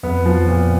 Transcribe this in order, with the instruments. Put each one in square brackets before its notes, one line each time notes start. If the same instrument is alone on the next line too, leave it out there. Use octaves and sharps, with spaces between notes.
[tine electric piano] F2 [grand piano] B3
[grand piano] F3
A#2